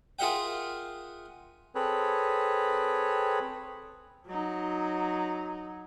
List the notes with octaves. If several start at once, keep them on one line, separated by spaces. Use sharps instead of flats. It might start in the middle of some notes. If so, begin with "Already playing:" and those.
F4 G#4 A#4 E5 F#5 G5
C4 G#4 A4 B4 C#5
F#3 D#4